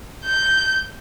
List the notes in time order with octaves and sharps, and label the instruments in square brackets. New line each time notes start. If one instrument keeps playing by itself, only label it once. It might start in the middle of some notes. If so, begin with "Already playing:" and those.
[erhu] G6